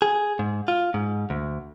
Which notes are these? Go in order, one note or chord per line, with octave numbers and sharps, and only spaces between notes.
G#4
G#2
F4
G#2
D2